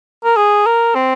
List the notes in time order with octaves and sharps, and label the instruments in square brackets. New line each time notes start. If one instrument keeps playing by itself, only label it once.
[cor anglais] A#4
G#4
A#4
C4